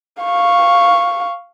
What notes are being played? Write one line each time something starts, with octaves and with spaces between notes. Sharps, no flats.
F5 C#6